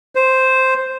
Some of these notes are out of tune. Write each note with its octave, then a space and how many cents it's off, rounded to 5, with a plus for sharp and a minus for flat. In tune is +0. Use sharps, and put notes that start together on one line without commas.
C5 +0